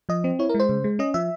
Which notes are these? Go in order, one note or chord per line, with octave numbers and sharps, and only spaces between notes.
F3 D#5
C4
E4 C#5
A#4
G#3
C5
C#3
G#3
C#4 D#5
F3 E5